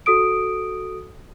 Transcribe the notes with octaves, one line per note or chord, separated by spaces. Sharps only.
F#4 A4 D#6 D7